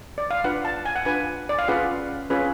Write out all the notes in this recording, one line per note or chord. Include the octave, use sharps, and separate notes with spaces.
D5
F5
D4 F4 B4 F#5
A5
G#5
F#5
D4 F4 B4 G#5
D5
F5
C#4 F4 G#4 B4 F#5
C#4 F4 G#4 B4